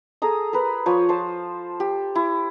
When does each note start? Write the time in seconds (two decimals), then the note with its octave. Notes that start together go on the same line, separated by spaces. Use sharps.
0.22 G#4 A4 A#5 D#6
0.53 A#4 B4
0.86 F3 C#5
1.09 C5 A5
1.80 G4
2.15 E4